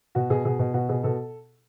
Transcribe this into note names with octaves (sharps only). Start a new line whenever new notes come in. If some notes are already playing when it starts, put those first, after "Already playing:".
B2 F#4
B2 G#4
B2 G#4
B2
B2 F#4
B2 G#4
B2 A4